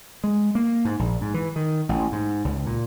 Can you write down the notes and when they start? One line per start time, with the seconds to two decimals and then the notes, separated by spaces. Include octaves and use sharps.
0.24 G#3
0.55 A#3
0.85 G#2
0.99 A#1
1.21 G#2
1.34 E3
1.56 D#3
1.89 A1
2.12 G#2
2.45 C#2
2.66 A#2